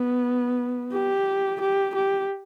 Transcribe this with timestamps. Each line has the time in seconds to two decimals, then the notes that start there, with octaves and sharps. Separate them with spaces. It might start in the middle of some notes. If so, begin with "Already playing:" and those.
Already playing: B3
0.93 G4
1.61 G4
1.95 G4